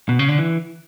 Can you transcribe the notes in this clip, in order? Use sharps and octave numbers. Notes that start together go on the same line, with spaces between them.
B2
C#3
D3
E3